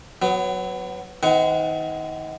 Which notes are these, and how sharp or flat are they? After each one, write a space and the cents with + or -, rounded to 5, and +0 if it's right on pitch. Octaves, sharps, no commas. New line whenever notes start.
F#3 +0 B3 +25
D#3 +25 C4 -45 F#5 +0